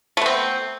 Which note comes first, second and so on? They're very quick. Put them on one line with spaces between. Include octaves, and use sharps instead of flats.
A3 B3 C4